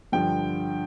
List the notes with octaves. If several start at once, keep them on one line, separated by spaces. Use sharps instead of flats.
G2 D3 F3 G5